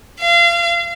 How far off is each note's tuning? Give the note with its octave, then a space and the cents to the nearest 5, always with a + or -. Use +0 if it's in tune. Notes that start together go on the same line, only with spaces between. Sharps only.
F5 -30